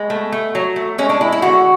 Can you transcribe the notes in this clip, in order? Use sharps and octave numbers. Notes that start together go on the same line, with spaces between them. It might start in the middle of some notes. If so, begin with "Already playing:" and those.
Already playing: G#3 B3
A3
A3
F#3
A3
G#3 C#4
D4
G#3 E4
E4
D3 F#4